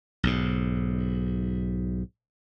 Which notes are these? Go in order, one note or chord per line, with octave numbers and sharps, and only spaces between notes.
B1 G#2